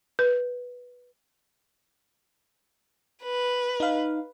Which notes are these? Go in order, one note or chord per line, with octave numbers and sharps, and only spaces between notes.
B4
B4
D#4 F5